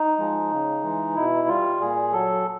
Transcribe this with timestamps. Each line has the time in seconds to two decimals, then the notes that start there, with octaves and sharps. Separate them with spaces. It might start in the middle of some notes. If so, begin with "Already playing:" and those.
Already playing: D#4
0.19 F3 G#3
0.51 C#3
0.83 E3 G#3
1.15 B2 E4
1.48 G3 F4
1.81 A#2 G#4
2.13 F#3 A4